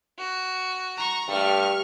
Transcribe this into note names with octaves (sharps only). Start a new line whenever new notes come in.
F#4
A#5 C#6
G2 G3 A3 C#6 F6